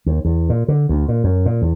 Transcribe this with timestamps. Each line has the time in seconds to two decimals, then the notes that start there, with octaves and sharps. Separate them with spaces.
0.06 D#2
0.25 E2
0.49 A#2
0.68 D3
0.89 D2
1.08 A#2
1.24 F#2
1.46 A#2
1.62 E2